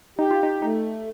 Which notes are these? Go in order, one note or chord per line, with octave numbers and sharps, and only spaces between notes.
D#4 G4
F4
D#4
A3 D#4